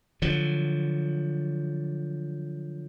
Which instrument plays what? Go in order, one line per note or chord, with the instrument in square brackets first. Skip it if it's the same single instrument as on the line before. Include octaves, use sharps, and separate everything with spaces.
[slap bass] D3 F3 F#3